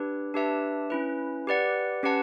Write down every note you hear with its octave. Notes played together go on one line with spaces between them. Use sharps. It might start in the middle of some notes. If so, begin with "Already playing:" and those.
Already playing: D4 G4 B4
D4 G4 B4 E5 A5
C#4 E4 B4
G4 B4 D5 F#5
C#4 G4 B4 F#5 A5